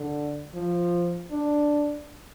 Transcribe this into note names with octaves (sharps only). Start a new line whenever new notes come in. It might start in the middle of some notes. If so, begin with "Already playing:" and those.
Already playing: D3
F3
D4